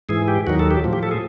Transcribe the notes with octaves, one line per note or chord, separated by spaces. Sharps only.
G#2 E3 G#4
G4
D#2 D#3 F#3 F#4
A4
G4
A2 F3
G4
A4
G#4